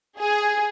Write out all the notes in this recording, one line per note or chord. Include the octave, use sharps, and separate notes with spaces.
G#4